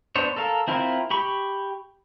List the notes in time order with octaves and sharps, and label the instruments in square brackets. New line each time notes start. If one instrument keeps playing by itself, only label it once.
[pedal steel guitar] B3 D4 C5 C#5
A4 A#4 F5
C4 E4 F4 A#4
G4 B5 C#6